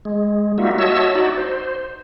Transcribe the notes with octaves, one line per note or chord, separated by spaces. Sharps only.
G#3
G3 A#3 D#4 F4 F#4 E5
F#4 C#5 D#5 E5 A5 E6
D#4 F#4 D5
C5